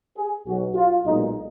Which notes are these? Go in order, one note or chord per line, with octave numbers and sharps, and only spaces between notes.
G#4
B1 B2 F#3 F#4
F4
B1 A#2 G#3 D#4